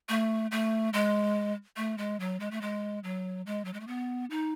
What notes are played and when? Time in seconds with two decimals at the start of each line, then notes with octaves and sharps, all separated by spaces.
0.09 A3
0.51 A3
0.93 G#3
1.77 A3
1.98 G#3
2.20 F#3
2.40 G#3
2.51 A3
2.61 G#3
3.04 F#3
3.46 G#3
3.65 F#3
3.74 G#3
3.80 A3
3.87 B3
4.31 D#4